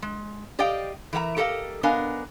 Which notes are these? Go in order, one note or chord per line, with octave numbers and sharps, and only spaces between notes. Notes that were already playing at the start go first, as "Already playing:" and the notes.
G#3
G4 D5 D#5 F5 G5
E3 A#4 E5 F#5 A#5
G4 A4 A#4 D#5 F5
B3 D4 A#4 D#5 F5 G#5